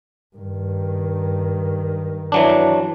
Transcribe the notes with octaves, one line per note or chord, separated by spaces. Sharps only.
G2 D#3
E3 F#3 D4